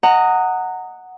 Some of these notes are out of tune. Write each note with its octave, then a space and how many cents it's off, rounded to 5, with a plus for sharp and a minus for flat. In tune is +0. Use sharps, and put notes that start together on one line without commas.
D#5 +0 F#5 +0 A#5 -25